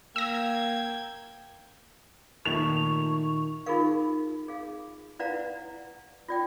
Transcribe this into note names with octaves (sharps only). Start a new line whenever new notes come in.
A#3 G5 E6 G#6 A#6
A#2 D#3 A3 D#4 C#6 F7
D#4 F4 G4 G#4 A#4 F5
G#4 F5
E4 B4 D5 F5 F#5 A#5
F4 D5 G5